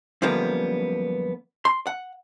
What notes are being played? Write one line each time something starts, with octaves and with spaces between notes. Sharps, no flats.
F#2 D3 F3 G3 A#3 B3
C6
F#5